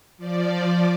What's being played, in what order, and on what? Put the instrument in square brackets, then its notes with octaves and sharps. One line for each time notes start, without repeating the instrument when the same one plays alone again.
[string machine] F3 D5